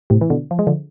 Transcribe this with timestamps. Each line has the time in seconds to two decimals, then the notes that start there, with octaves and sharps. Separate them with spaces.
0.10 A2 C3
0.21 E3
0.30 B2 D3
0.51 F3
0.59 G#3
0.67 D3 F3